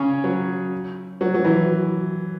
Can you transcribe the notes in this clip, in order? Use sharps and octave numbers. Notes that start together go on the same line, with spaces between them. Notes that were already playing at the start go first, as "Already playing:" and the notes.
Already playing: C#3 C#4
F#3
F#3
F#3
E3